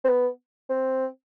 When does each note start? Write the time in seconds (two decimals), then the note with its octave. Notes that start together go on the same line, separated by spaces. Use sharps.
0.04 C4
0.09 B3
0.70 C4